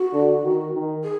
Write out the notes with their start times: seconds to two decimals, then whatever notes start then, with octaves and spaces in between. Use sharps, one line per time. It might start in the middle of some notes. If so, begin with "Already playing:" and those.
Already playing: F#4
0.13 D3
0.44 D#3
0.73 D#3
1.03 G#4